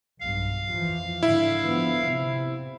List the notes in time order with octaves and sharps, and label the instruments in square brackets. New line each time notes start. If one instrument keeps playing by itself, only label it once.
[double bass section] B1 G2 [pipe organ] F5
[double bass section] F2 E3 F3
[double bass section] G#2 D3 [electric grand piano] E4
[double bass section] D3 F3 B3
C3 C4